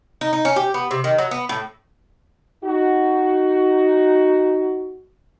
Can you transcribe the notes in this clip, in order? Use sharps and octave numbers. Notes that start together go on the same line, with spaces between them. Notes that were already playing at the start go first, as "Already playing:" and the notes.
D#4
D#4
C#4
G4
B3
C3
D#3
F#3
B3
A2
D#4 F#4